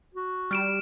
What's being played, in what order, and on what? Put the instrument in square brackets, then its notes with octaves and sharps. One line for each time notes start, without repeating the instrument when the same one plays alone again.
[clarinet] F#4
[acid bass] G3 [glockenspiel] F6 D7 E7